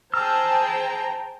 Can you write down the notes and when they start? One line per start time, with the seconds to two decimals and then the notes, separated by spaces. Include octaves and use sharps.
0.14 G#4 C5 G5 A5 A#5 E6 F6